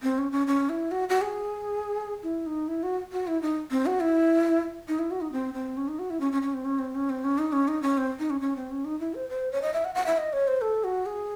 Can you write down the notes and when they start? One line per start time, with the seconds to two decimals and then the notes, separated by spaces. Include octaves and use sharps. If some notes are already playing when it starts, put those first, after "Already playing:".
0.03 C4
0.18 C#4
0.32 C#4
0.47 C#4
0.69 E4
0.91 F#4
1.09 F#4
1.21 G#4
2.23 E4
2.46 D#4
2.68 E4
2.83 F#4
3.12 F#4
3.27 E4
3.42 D#4
3.71 C4
3.86 F#4
4.00 E4
4.88 D#4
4.99 E4
5.11 F#4
5.21 D#4
5.32 C4
5.54 C4
5.77 C#4
5.88 D#4
5.99 F#4
6.10 E4
6.20 C#4
6.32 C#4
6.42 C#4
6.54 C4
6.65 C#4
6.79 C4
6.95 C#4
7.09 C4
7.24 C#4
7.38 D#4
7.52 C#4
7.68 D#4
7.82 C#4
7.98 C4
8.19 D#4
8.30 C#4
8.41 C#4
8.56 C4
8.71 C#4
8.85 D#4
9.00 E4
9.14 C5
9.29 C5
9.52 C#5
9.62 D#5
9.73 E5
9.84 F#5
9.95 F#5
10.06 E5
10.18 D#5
10.33 C#5
10.47 C5
10.61 A4
10.84 F#4
11.06 G#4